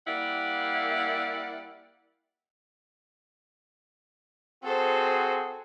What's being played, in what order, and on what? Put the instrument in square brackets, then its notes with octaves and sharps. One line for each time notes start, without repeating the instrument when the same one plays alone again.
[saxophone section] G3 A#3 E4 D5 F5 F#5
[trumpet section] C4 F#4 G#4 [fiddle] A4 C5